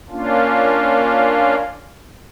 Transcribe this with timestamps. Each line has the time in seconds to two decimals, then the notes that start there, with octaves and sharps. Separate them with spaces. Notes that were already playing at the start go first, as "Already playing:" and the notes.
0.10 A#3 C#4 D4 F4